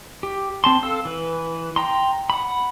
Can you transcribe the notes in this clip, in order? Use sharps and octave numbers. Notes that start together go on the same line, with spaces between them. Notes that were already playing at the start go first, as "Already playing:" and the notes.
G4
C4 A5 C6
A4 F5 E6
E3 B4
G5 A#5 C6
F#5 B5